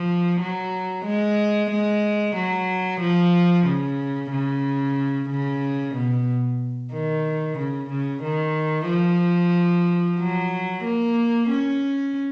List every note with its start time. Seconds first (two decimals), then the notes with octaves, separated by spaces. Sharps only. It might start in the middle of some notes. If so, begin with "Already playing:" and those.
Already playing: F3
0.41 F#3
1.06 G#3
1.71 G#3
2.36 F#3
3.01 F3
3.67 C#3
4.32 C#3
5.30 C#3
5.95 B2
6.93 D#3
7.59 C#3
7.90 C#3
8.23 D#3
8.89 F3
10.19 F#3
10.84 A#3
11.49 C#4